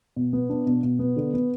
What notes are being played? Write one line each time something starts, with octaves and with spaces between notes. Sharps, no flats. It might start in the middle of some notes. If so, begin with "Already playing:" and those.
B2
B3
D4
B2
B2
B3
D3
B3